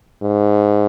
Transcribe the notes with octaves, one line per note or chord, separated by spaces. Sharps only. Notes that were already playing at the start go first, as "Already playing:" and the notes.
G#2